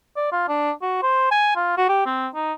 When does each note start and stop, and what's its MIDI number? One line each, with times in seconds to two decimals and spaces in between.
0.17 0.28 74
0.32 0.46 65
0.48 0.72 62
0.82 1.01 66
1.03 1.29 72
1.31 1.53 80
1.56 1.73 65
1.77 1.87 66
1.89 2.06 67
2.06 2.28 60
2.35 2.53 63